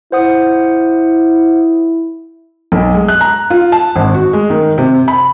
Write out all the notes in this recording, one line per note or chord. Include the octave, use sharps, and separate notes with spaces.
E4 C5 F#5 D#6
B1
G#3
F#6
A#5
F4
A5
G#1
F#4
G#3
D#3
C3
B5